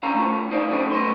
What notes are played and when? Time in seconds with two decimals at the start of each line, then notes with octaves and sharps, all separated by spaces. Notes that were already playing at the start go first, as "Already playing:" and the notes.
0.03 C2 D3 C#4 F5 A#5
0.15 A3 F4
0.51 D#4 C5 D5 F5
0.70 C#3 F#3 A3 C4
0.92 G#2 A3 B3 C6